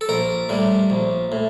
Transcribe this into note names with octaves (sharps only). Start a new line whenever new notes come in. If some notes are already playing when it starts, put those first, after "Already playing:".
A4
A#1 A#4
A2 G3
A#1
A2